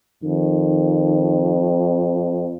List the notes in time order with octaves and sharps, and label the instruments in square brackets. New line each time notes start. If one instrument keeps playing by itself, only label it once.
[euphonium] F2 [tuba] D#3